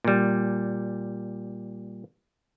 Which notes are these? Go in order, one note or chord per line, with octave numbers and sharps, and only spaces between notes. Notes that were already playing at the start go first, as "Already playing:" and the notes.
A#2 G3